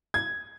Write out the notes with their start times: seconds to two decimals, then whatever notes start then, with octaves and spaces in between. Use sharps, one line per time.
0.14 G#6